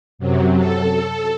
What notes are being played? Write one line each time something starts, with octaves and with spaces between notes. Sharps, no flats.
F#2 C3 F#3
A4